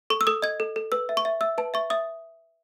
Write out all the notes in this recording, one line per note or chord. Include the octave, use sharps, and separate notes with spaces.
A4 C#6
E6
A4 D#6
D#5 G#6
A4
A4
B4 E6
E5
C#6
E5
E5 E6
B4 A5
E5 C#6
E5 D#6